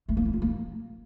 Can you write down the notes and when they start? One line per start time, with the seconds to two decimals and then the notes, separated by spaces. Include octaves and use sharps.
0.09 A3
0.17 A#3
0.25 E4
0.33 F4
0.42 A#3